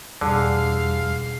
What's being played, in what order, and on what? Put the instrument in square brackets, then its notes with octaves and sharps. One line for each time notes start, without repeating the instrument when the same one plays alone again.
[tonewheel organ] E2 G3 [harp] B2 G#4 [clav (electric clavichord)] D3 [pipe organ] F5